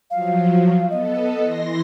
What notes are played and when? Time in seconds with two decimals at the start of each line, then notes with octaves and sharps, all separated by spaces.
0.11 F3 F#3 F5
0.90 B3 A4 D#5
1.41 E3 C6 A#6